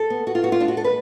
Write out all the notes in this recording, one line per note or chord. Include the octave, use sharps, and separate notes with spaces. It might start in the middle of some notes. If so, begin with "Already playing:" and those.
Already playing: A4
B3
B3 F#4
F4
B3 F#4
F4
G#3 D4
F#4
G#3 A4
B4